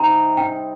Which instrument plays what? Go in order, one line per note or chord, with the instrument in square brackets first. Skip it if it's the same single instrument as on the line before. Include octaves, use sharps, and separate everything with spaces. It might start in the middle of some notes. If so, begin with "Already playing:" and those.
Already playing: [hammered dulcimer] C3 G3 C4 D#4 [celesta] A#5
[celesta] G5